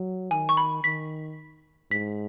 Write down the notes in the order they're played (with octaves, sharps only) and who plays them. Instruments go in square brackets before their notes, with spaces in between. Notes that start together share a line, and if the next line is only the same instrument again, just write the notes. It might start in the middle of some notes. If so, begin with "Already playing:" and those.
Already playing: [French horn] F#3
[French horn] D#3 [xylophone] G#5
[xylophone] C#6
B5
[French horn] D#3 [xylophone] B6
[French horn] G#2 [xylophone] B6